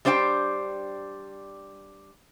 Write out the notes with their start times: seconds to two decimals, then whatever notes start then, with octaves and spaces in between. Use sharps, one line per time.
0.05 G3 D4 C5 D5 G5